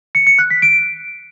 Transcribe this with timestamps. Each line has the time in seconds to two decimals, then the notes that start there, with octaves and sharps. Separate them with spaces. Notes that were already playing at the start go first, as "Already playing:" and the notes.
0.15 C#7
0.27 C#7
0.39 F#6
0.50 B6
0.62 D7